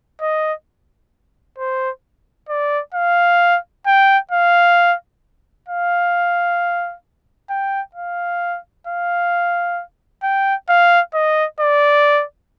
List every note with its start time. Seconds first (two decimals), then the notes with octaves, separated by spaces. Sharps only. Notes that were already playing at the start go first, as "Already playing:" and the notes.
0.21 D#5
1.58 C5
2.49 D5
2.94 F5
3.86 G5
4.31 F5
5.69 F5
7.50 G5
7.95 F5
8.87 F5
10.23 G5
10.69 F5
11.14 D#5
11.60 D5